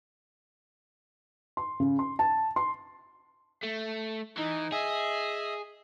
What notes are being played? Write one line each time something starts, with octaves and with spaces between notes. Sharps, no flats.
C6
C#3
C6
A5
C6
A3
E3 D#4
G#4 D#5 E5